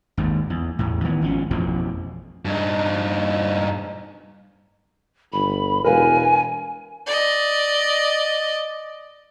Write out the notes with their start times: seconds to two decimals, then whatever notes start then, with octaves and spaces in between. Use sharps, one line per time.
0.17 G#1 D#2 G#2
0.50 E2
0.79 E2 A2
1.04 D#3 E3 B3
1.22 G#1 F3 C#4
1.51 A1 F2 B2 F3
2.45 G2 D#4
5.32 G1 B5
5.84 E1 A#4 B4 F5 G#5
7.07 D5 D#5